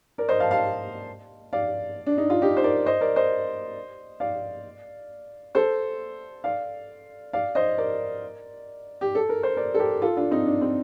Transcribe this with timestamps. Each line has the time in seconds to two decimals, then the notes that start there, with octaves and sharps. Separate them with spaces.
0.18 A#4 D5
0.29 C5 D#5
0.40 F5 A5
0.51 F5 A5
1.53 D5 F5
2.07 D4
2.18 D#4
2.30 F4
2.42 D#4 G4
2.57 C5
2.64 A#4 D5
2.86 C5 D#5
3.01 A#4 D5
3.16 C5 D#5
4.20 D5 F5
5.55 A4 C5
6.44 D5 F5
7.33 D5 F5
7.55 C5 D#5
7.78 A#4 D5
9.01 G4
9.15 A4
9.29 A#4
9.43 C5
9.56 A#4 D5
9.74 A4
9.79 G4 A#4
10.02 F4 A4
10.17 D4 F4
10.31 C4 D#4
10.46 D4
10.61 C4